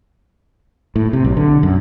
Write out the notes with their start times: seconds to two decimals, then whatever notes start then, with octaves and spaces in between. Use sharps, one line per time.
0.96 A2
1.13 C3
1.24 B1
1.37 D3
1.63 F#2